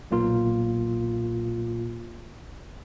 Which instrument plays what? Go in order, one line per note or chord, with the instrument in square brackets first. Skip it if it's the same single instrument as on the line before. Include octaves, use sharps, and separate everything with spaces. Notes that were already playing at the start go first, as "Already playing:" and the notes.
[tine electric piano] B1 A#2 A#3 F4